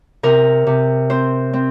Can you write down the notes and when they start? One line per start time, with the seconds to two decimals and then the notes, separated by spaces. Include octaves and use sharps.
0.23 C3 A#4
0.67 C3
1.10 C4 C5
1.53 C4